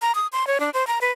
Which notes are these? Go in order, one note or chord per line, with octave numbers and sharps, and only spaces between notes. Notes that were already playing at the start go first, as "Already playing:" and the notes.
A#5
D#6
C6
C#5
D4
C5
A#5
B4